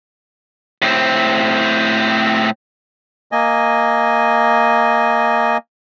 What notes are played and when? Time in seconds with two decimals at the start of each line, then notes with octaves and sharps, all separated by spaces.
0.82 A2 C4
3.32 A#3 D#5 G#5